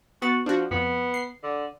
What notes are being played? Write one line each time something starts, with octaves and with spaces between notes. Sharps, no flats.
B3 F#4 A6
F3 D4 F#4
F2 B3
C7
D3